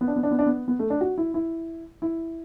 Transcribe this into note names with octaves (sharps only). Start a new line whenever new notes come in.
B3
D4
B3
D4
B3
D4
B3
B3
A3
D4
F#4
E4
E4
E4